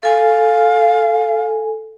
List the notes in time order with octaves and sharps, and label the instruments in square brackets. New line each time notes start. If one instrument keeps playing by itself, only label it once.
[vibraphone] A4 G#5 [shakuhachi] F5